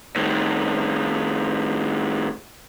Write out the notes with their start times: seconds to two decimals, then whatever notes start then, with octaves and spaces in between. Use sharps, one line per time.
0.16 A2 D#3